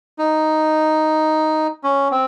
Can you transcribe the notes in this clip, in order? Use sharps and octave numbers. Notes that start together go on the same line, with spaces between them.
D#4
C#4
C4